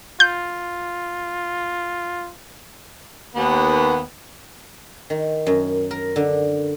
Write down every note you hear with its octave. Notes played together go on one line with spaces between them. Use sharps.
F4 G6
D#2 B3
D#3
F#2
A#4
D3